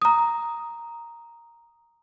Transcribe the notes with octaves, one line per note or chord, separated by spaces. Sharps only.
A#5 D#6